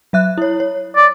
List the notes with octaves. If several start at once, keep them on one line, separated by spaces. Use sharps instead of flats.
F#3 E5 F#6
E4 C#5
C#5
D5